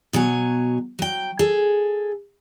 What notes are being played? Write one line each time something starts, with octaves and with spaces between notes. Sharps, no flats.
B2 F#3 C#5 G#5
F#3 G5
G#4 A4